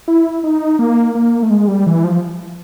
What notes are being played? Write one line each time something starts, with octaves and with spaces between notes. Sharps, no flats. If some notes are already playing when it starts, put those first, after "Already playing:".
E4
D#4
A#3
A#3
A3
G#3
G3
E3
F3